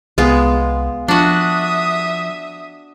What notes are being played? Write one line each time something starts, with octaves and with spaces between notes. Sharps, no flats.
C2 G#3 B3 F4
F3 D4 F#4 E5 D#6